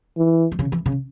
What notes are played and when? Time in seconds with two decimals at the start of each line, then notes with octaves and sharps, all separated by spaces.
0.17 E3
0.52 E3
0.59 C#3
0.72 E3
0.86 C#3